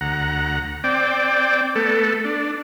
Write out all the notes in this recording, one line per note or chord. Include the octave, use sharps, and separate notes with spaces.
D2 F#5 A#5
C4 D5 G5
A3 B3 A4
D4